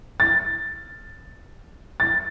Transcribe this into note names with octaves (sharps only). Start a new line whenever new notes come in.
A6
A6